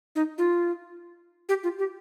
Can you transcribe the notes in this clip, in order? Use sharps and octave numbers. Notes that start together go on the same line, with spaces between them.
D#4
F4
G4
F4
G4